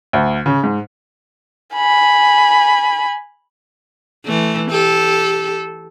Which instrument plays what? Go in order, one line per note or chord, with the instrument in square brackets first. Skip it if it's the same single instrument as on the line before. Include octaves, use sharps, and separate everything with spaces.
[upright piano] D2
C#3
G#2
[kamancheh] G#5 B5
[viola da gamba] E3 A3
G4 A4